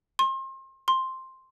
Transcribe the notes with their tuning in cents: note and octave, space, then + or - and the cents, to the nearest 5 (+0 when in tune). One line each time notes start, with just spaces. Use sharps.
C6 +35
C6 +5